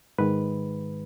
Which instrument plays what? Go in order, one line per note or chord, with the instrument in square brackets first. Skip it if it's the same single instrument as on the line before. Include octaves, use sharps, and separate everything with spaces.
[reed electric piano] G#2 D#3 G#3 B4